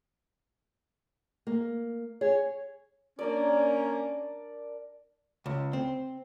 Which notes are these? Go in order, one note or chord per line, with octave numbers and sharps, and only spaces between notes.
A#3
G#4 C#5
A#3 C#4 D4 A#4 D5
C#2
C4